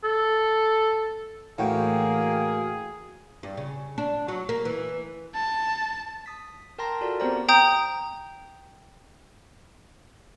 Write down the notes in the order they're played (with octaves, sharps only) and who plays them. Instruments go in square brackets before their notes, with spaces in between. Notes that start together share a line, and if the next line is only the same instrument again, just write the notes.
[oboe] A4
[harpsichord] A2 [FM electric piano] E3 F#4 G5 [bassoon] A#3 [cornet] G#4
[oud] G2
C#3
D4
F#3
A#3
E3
[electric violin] A5
[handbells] D#6 B6
A#4 G5 A5 A#5 C6 A#6
F4 F#4 A4 A#4 D5
B3 C4 G4 C5 D5 A#5
[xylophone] G5 A#5 D#6 G6